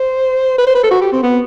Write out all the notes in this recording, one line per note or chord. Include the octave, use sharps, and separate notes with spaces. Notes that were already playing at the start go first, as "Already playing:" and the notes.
Already playing: C5
B4
C5
B4
A4
F#4
G4
C4
B3